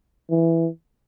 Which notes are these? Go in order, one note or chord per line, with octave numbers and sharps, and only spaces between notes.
E3